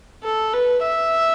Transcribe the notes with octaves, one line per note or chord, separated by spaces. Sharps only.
A4
B4
E5